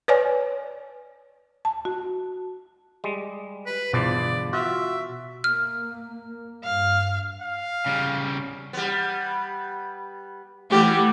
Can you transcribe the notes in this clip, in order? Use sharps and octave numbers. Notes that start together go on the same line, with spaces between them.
B4 C#5 D5 G#5
A5
F#4
G3 G#3
B4
G1 E2 B2 F3 D5
F4 F#4 E5
A#3 F6
G2 F5
F5
C#3 G3
G3 B3
E3 G3 A3 B3 G4